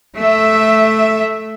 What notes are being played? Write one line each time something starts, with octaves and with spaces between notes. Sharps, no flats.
A3 E5